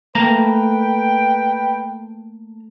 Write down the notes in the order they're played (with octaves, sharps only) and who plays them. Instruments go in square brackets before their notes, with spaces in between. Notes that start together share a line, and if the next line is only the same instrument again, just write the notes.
[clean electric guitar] A3 A#3 A#5 [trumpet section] B4 G5